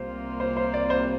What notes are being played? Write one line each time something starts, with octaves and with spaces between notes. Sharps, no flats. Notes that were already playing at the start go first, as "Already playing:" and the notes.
Already playing: C2 C3 A#3 F4 C5
C5
C5
D5
C5